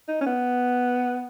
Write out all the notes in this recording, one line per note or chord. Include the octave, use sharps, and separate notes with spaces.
D#4
C#4
B3